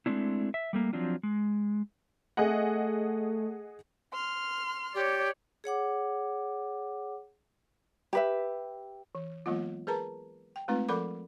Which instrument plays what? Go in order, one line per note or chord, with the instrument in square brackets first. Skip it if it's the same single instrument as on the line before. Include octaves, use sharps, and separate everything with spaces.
[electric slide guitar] G#3 A3 C4 D4 E4
E5
G3 A3 A#3
F3 F#3 C4 D4 F4
G#3
[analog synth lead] A3 [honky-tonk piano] G#4 D#5 F#5
[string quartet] C6 F6
[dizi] G4 [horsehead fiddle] C#5 D5
[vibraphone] G#4 C#5 F#5 D6
[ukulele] G4 B4 E5
[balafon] E3
E3 F#3 G#3 A#3 B3 F4
G#4 A#4 B4 A5 A#5
G5
G#3 A3 C4 D#4 F4 B4
F3 A4 A#4 F#5 B5 D6